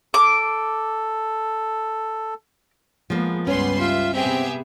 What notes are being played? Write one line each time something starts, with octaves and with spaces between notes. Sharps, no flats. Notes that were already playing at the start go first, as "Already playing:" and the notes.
A4 D6
F3 G#3 A#3 B3
C#2 G2 G3 B3 C#4 B4 C6
F4 E5
C3 B3 C4 G4 G#4 E5